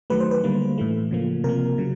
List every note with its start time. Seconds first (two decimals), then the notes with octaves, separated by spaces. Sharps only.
0.10 D#3 F#3 A3 B4
0.20 C5
0.31 B4
0.44 D3 G3 A#3
0.78 A2 E3 A3
1.11 C#3 F3 A#3
1.44 C3 F3 A#3 A#4
1.78 C#3 F#3